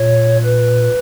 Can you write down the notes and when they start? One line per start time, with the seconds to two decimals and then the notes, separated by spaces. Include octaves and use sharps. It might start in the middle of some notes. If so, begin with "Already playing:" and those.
Already playing: A#2 C#5
0.44 B4